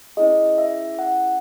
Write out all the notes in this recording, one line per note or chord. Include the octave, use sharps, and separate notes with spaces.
C#4 E4 G#4 D#5
E5
F#5